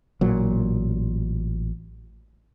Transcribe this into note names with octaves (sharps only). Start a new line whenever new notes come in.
A1 A#2 F#3